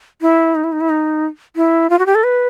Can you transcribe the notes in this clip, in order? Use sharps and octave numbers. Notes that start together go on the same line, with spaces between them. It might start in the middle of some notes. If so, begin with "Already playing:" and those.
E4
D#4
E4
D#4
E4
D#4
E4
F4
F#4
G4
A4
B4